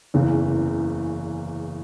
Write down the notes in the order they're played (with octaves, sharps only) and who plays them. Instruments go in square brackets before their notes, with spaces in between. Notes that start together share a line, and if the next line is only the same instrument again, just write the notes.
[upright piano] F#1 E2 C#3 E3